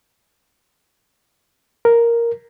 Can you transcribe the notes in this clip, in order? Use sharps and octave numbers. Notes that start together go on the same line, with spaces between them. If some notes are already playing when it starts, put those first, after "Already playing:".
A#4